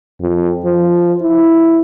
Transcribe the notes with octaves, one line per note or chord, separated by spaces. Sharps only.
F2
F3
E4